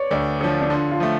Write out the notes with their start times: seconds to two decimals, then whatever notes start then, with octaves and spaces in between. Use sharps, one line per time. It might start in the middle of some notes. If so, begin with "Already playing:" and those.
Already playing: B4 C#5 D5
0.11 D2 D5
0.41 D3 F3 C#5
0.61 D4
0.70 D3 F4
0.91 F4
1.00 F3 A3